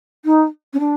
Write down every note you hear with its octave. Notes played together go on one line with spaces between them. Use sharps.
D#4
C#4
D4